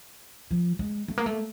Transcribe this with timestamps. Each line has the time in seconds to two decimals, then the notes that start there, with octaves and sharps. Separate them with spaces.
0.51 F3
0.79 G#3
1.08 A3
1.18 A#3
1.26 A3